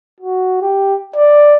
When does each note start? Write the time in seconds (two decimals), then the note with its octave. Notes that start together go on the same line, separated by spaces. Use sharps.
0.21 F#4
0.62 G4
1.16 D5